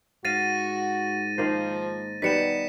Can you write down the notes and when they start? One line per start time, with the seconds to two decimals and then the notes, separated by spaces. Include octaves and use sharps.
0.25 G#2 F#4 F5 A6 A#6 D#7
1.38 D#3 F3 A#3 C5
2.22 B2 D#3 G3 B3 B6 C#7 E7